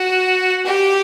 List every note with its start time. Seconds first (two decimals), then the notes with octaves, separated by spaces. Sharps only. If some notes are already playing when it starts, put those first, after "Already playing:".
Already playing: F#4
0.66 G4